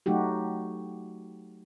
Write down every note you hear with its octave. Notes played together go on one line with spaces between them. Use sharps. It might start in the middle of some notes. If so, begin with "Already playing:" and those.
F#3 A3 D#4 F#4 G4